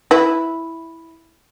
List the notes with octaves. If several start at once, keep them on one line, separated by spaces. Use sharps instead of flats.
E4 B4